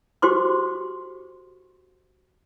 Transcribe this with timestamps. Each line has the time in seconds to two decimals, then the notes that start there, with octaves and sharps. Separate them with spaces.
0.22 F#4 G4 A4 C5 C6 D6